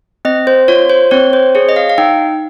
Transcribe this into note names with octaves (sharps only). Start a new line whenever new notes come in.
C4 D#5
C5
F4 C#5
C5
C4 C#5
C5
G#4 C#5
D#5
F5
F5
D#4 G5